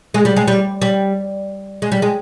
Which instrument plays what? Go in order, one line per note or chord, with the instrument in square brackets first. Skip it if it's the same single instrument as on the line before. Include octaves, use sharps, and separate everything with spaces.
[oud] G#3
G3
G#3
G3
G3
G#3
G3
G#3